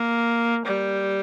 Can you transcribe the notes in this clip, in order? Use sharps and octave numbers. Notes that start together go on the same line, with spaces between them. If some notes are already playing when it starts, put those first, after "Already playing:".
Already playing: A#3
G3